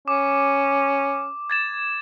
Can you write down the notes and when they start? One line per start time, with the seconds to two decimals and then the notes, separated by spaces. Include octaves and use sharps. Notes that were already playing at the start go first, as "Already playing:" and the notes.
0.08 C#4 D6
1.50 G#6 A6 E7